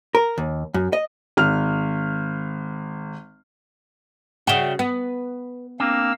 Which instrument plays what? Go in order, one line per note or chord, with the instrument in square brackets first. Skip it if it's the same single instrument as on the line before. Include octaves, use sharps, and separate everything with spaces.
[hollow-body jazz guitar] A#4
D#2
F#2
D#5
[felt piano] G#1 F6
[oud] C#3 F#4 [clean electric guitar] D5 E5 G5
[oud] B3 [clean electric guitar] B4
[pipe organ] A#3 F5 E6 [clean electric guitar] C4 D4